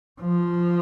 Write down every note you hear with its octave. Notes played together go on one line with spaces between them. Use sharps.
F3